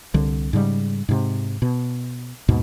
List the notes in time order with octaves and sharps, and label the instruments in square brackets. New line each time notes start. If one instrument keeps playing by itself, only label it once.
[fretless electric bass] C2 D3
G#2 C#3 G3
G#2 C3
B2
D#2 G#2 B2